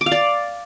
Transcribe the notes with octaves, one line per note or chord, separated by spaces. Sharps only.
D6
F5
D5